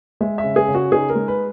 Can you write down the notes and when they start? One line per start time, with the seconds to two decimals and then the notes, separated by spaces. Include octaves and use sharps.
0.21 G#3 E5
0.38 E5
0.44 C#3
0.56 G#4
0.68 C#3
0.75 F#4
0.92 D#4 G#4
1.10 A#4
1.15 G#3
1.28 B4